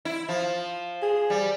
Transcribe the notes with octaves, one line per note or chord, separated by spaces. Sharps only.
E4
F3
G#4
G3